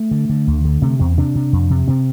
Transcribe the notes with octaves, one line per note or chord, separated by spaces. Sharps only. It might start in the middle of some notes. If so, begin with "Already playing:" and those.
Already playing: A3
D3
D3
D2
D3
C3 A3
E2 C4
C3 D4
C3
F2
C3
C3 C4